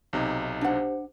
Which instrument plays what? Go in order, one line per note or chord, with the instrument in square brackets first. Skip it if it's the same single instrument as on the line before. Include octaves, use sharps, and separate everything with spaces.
[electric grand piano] B1 C3 D#4
[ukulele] D4 F#5 [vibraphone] G4 C5